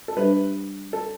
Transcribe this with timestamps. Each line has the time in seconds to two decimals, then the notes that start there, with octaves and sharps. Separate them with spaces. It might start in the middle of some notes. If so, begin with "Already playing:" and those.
0.08 A4
0.17 G3 D4 G4 B4 C5 E5
0.93 A4